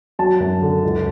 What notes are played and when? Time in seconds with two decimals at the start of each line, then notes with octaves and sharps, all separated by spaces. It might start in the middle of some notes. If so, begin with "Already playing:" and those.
0.19 F#3 A5
0.40 F#2
0.62 D3
0.84 C#2